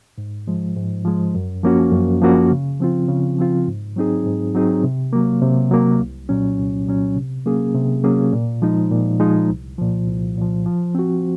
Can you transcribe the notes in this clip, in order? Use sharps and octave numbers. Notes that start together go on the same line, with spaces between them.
G#2
F3 G#3
G#2
F3 G#3
F#2
F3 A#3 C#4 F#4
F#2
F3 A#3 C#4 F#4
C#3
F3 C4 F4
C#3
F3 C4 F4
G#2
F#3 C4 D#4 G#4
G#2
F#3 C4 D#4 G#4
C3
F#3 A#3
C3
F#3 A#3
C2
A#2 F#3 C#4
C2
A#2 F#3 C#4
C3
F#3 A#3 C#4 G#4
C3
F#3 A#3 C#4 G#4
A#2
F3 G#3 D#4
A#2
F3 G#3 D#4
C2
A#2 F3
C2
A#2 F3
F3
C4 F#4